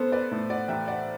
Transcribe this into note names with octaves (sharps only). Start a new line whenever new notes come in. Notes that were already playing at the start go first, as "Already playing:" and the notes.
Already playing: B3 A4 C5
B4 D5
A2
D5 F#5
A1 E5 G5
D5 F#5